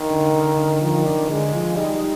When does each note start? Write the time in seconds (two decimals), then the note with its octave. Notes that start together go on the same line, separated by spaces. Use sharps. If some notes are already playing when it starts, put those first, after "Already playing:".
Already playing: D#3
0.10 D3
0.34 D3
0.58 D3
0.81 D#3 F3
1.05 D4
1.30 D3 G#3
1.53 F3
1.76 G3 D#4